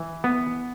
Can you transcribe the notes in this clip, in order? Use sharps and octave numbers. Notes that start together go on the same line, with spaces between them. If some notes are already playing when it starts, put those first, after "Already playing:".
Already playing: E3
B3